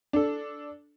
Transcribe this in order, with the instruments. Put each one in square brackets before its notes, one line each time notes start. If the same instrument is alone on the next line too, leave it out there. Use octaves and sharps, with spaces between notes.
[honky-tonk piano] D4 A4